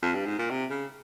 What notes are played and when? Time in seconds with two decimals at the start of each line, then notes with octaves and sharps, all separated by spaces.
0.02 F2
0.14 G2
0.26 G#2
0.38 A#2
0.50 C3
0.70 C#3